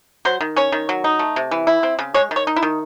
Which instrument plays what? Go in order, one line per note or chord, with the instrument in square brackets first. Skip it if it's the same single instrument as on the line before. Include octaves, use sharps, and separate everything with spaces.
[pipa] F#3 C5
D#3
C#4 C#5
D#3
F#3
D#4
A3
C3
E3
E4
C4
C#3
G#3 C#5
D#3
C#5
D#4
E4
D#3